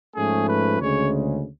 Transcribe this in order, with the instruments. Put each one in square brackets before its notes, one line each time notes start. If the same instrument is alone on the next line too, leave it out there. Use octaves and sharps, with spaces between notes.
[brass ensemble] G#2 F3 A3 C#4 G#4
B4
D2 C#3 G#3 C#4 C#5